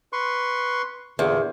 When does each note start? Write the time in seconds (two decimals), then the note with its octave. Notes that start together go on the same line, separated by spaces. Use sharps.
0.13 B4 C6 C#6
1.19 E2 A#2 D3